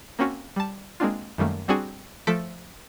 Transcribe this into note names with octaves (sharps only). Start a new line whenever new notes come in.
A#3 C4 C#4 F#4
G3 A5
G#3 A#3 C4 D4 F4
F#2 D#3 G3 A3 A#3
G3 C4 D4 F#4 G#4
F3 A3 A4 B6 D7